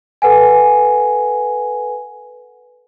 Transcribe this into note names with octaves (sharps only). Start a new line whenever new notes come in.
A4 B4 F#5 G#5